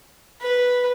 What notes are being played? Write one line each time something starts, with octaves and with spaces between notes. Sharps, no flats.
B4